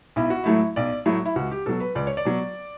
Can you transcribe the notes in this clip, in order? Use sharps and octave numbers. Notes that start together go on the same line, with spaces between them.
B1 E4
F#4
A2 F#3 A3 E4
B1 D5
A2 F#3 A3 E4
E4
C#2 F#4
G4
B2 F#3 A4
B4
C#2 D5
C#5
D5
B2 F#3